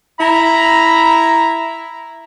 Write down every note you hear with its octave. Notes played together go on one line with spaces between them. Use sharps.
E4 A#5